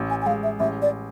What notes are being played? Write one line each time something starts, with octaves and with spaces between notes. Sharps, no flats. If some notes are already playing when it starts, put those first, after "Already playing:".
Already playing: A1
G#5
G#5
G#3 F5
E5
A1 E5
D5